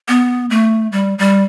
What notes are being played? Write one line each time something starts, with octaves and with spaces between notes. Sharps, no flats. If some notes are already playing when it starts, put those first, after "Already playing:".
B3
A3
G3
G3